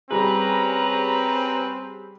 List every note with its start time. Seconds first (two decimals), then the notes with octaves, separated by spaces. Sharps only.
0.11 G3 C4 C#4 G#4 B4 A#5